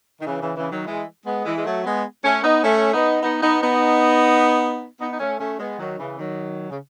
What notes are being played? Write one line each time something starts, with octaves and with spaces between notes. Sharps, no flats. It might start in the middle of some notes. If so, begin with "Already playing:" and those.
D#3
C#3 E3
C#3 E3
C#3 E3
D#3 F#3
E3 G#3
G#3 B3
E3 G#3
G#3
F#3 A3
G#3 B3
A3 C#4
B3 D#4
A3 C#4
B3 D#4
B3 D#4
B3 D#4
B3 D#4
B3 D#4
D#4
A3 C#4
A3 C#4
G#3 B3
D#3 F#3
C#3 E3
D#3 F#3
C#3